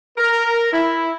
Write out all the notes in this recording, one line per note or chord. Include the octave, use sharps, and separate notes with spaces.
A#4
E4